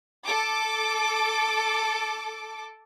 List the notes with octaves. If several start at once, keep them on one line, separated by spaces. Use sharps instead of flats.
A4 D6